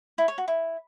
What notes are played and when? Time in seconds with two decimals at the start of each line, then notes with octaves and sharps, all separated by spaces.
0.18 E4
0.28 C#5
0.38 F#4
0.48 E4